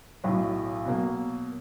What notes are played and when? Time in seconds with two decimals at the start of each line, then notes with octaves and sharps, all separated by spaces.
0.24 B1 A2 F#3
0.85 B2 F#3 A#3